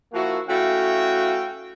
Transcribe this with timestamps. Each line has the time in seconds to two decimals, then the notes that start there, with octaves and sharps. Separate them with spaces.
0.13 F3 A#3 E4 F#4
0.48 A3 C#4 E4 F#4 F5 G5